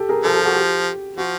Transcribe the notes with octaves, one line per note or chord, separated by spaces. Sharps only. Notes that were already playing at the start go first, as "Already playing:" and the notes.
Already playing: G4 A4
G#4 A#4
F3 G4 A4
G4 A4
F#4 G#4
G4
F3 F#4